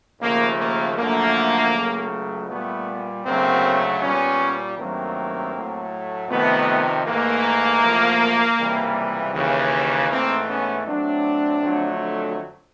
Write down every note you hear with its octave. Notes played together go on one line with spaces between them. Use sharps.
D#2 C#3 F3 A3 A#3
A#3
F#2 D3 F3 A3 A#3
C#2 C#3 F#3 A3
A#2 G3 A3 B3
D2 C#3 F#3 A3 A#3 C4
A#2 G3 B3 C#4
G2 D#3 F#3 A3 A#3 C4
A2 F#3 A3
F2 C3 D#3 A3 B3
G#2 E3 A3 A#3
E2 C3 F3 A3
C#2 C3 E3 G3
D#2 C#3 E3
G#2 E3 A3 A#3 C4
B3 C#4
A2 F#3 A3 C4 D4
F2 D3 F#3 A3